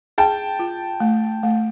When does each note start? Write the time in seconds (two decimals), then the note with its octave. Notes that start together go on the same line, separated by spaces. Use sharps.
0.18 G#4 G5 A5
0.59 F4
1.00 A3
1.43 A3